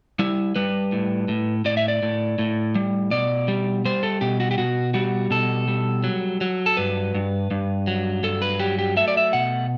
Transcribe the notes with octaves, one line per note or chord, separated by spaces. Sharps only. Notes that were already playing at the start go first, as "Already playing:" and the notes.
G3 E4
G3 B4
A2
A2
A2 D5
E5
D5
A2
A2
G3
B2 D5
G3
G3 C5
A4
B2 G4
F#4
G4
B2 F#4
G3 F#4
B2 A4
G3
F#3
F#3
A4
G2 B4
G2
G2
F#3
G2 A4
B4
F#3 G4
G4
A3 E5
D5
E5
B2 F#5